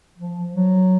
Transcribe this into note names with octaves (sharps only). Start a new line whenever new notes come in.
F3
F#3